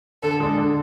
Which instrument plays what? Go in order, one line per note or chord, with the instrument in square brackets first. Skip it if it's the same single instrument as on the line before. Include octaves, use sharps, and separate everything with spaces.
[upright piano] D3 [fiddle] A4
[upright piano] G#3 D4
D3